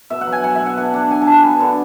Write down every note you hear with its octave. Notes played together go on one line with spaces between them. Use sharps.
B2 E5
F#5
F#3
G#5
F#3 F#5
E5
B2
F#5
D4 F#5
D4
D4 G#5
A5
D4
G#5
B3
D3